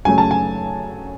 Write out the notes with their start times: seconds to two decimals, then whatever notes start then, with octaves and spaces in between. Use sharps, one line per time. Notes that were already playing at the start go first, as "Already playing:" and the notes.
0.05 F#2 C#3 F#3 A3 G#5
0.18 A5
0.31 G#5